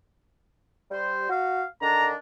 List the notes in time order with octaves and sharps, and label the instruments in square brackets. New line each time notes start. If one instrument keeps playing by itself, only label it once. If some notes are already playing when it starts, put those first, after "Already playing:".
[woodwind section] G3 C5
F#4 F5
[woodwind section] D3 D#3 D4 [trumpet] A#5